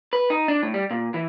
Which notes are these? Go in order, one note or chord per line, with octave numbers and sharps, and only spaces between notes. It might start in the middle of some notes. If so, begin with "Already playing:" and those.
B4
D#4
D4
A2
G3
A#2
E3